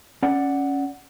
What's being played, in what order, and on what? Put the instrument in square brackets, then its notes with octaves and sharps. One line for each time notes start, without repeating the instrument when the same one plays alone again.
[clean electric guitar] C#4 D5 F#5